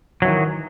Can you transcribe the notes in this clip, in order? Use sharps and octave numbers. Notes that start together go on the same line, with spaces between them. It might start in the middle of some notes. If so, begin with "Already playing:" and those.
D#3 E3 F#3